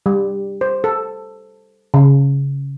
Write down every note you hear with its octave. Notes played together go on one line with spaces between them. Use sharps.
G3
C5
A4
C#3